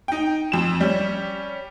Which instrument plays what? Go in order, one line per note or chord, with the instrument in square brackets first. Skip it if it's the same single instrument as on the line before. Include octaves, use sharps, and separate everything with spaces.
[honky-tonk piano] D#4 G5
F2 E7
G3 C#4